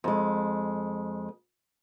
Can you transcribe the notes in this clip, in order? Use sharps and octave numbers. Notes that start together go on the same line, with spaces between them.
F2 G#3